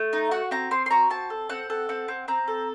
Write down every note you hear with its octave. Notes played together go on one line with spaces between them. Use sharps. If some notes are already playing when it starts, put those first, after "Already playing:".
Already playing: A3
D#4
F#4 F#5
C4 A#5
C4 C6
C6
F#4 A#5
C4 A5
A4
C4 F#5
A4
C4 F#5
C4
C4 A#5
A4